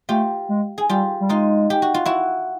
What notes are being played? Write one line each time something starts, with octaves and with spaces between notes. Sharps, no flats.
A3 F4 G4
G#3
G#4
G3 F4 G4
G3
G#3 D#4 F4
G4
F#4
F4
E4 F#4